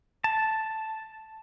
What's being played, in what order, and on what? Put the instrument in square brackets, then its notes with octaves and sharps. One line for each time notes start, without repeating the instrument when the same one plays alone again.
[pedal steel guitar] A5